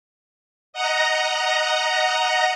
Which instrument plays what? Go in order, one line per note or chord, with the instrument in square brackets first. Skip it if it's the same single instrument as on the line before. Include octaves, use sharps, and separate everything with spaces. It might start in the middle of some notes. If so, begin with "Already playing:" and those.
[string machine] D#5 F#5 A#5